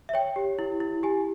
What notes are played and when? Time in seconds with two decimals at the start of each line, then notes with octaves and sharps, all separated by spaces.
0.09 E5
0.14 C#5 G5
0.36 G4
0.59 E4
0.80 E4
1.03 G4 G#5